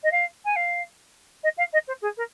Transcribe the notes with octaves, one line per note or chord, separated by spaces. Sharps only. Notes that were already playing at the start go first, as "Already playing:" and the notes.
D#5
F5
G#5
F5
D#5
F5
D#5
C5
G#4
A#4